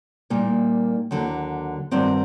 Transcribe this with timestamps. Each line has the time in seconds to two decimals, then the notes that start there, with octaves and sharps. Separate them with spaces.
0.30 A#2 G3 A#3 D#4
1.11 D#2 D3 F#3
1.91 G2 D#3 F#3 C4 D5